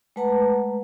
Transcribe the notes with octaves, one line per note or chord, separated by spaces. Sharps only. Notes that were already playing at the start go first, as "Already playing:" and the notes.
G#3 A3 B4 F#5 A5 A#5